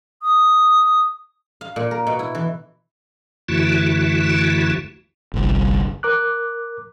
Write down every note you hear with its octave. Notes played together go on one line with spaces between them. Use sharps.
D#6
F5
A#2
A#4
B2
E4
E3
F#2 D3 E3 A3 E4 F#4
G1 C2
A#4 D6 F#6